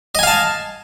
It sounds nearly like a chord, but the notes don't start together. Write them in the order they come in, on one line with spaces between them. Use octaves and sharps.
D#5 G#5 F5 A5